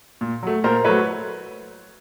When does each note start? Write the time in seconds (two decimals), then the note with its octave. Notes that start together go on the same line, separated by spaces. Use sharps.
0.21 A#2
0.43 F#3 A3
0.64 A#2 A#4 C5
0.84 F#3 A3 B4 C#5